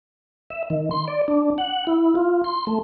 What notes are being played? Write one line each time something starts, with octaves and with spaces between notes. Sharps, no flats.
E5
D#3
C6
D5
D4
F#5
E4
F4
C6
A3